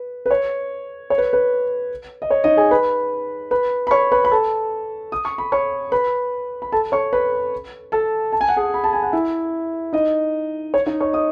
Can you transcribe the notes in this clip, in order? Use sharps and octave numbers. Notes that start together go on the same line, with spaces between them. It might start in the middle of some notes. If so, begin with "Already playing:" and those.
Already playing: B4
B4
C#5
C#5
B4
B4
D#5
C#5
D#4 D#5
G#4 G#5
B4 B5
B4 B5
B5
C#5 C#6
B4 B5
B5
A4 A5
D#6
C#6
B5
C#5 C#6
B4 B5
B5
A4 A5
C#5 C#6
B4 B5
A4 A5
A5
G#5
F#5
G#4 G#5
B5
A5
G#5
F#5
E4 E5
D#4 D#5
C#5
D#4 D#5
C#5 C#6
D#5 D#6